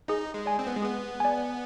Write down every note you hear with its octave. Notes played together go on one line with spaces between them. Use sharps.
D#4 G#4
G#3
D5 G#5
C4
B3
G#3
B3 G#4
D5 G#5